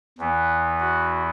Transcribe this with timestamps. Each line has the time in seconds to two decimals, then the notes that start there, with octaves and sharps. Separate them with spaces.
0.18 E2 E3 B3
0.80 F#4